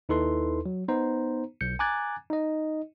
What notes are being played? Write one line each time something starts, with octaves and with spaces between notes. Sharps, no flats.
D#2 D#4 E4 A4 B4 C6
F#3
B3 D#4 C5 A#5
B1 G6 C#7
G#5 A#5 D6 F#6 G#6 A6
D#4 D#5